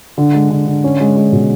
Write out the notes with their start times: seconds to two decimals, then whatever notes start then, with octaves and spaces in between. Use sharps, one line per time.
0.18 D3
0.34 G#3
0.50 D3
0.66 D3
0.84 C#4
1.00 G#3
1.16 G#3
1.32 B2